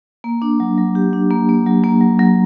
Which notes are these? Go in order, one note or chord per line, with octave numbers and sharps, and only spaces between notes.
A#3
D4
F#3
F#3
G4
D4
A#3
A#3
F#3
A#3
F#3
F#3